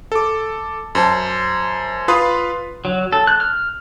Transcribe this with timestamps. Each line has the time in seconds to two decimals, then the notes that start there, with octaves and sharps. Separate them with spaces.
0.12 A4 D6
0.95 F#2 C5 A5
2.08 F4 B4 F5 B5 C6 D#6
2.85 F#3
3.13 A4
3.27 F#6
3.40 F6